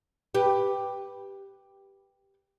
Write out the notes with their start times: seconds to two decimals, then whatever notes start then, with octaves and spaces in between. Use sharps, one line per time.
0.35 G4 B4